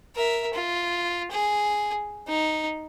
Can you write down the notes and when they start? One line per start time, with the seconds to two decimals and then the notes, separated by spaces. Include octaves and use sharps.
0.16 A#4 E5
0.53 F4
1.31 G#4
2.27 D#4